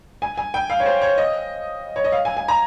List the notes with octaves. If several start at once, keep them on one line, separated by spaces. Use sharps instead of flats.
G#5
G#5
G5
F5
C#5
C5
C#5
D#5
C#5
D#5
F5
G#5
G#5
A#5